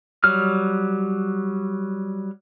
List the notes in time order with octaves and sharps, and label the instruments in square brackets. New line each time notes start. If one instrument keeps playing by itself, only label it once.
[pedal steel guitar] F#3 G3 F6